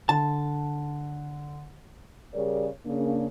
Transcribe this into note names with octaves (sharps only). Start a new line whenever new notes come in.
D3 A5
C#3 G3 G#4 A#4 C#5 D5
C#3 A#3 D4